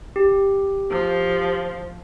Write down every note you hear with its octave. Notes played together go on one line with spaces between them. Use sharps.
G4
F3